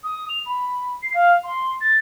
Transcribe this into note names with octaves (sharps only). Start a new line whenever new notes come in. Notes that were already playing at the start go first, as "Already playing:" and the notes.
D#6
F7
B5
C7
F5
C6
A6